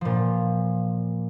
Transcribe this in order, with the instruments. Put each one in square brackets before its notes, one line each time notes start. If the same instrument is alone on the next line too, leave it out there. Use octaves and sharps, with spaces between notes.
[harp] A#2 F3